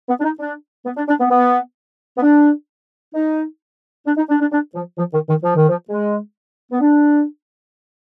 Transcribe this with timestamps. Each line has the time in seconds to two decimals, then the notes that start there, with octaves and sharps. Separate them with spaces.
0.09 B3
0.20 D4
0.24 D#4
0.39 D4
0.86 B3
0.97 D4
1.08 D4
1.20 B3
1.31 B3
2.18 B3
2.23 D4
3.14 D#4
4.06 D4
4.17 D#4
4.29 D4
4.41 D4
4.52 D4
4.75 F3
4.98 F3
5.13 D#3
5.29 D#3
5.43 F3
5.56 D#3
5.69 F3
5.89 G#3
6.72 B3
6.81 D4